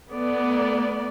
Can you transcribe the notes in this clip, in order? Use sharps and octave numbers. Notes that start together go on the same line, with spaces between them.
A3 B3 D5